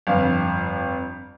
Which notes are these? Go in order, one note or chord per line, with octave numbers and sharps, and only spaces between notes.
G1 F2 F5